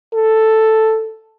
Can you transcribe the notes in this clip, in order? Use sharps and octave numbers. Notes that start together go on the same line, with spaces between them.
A4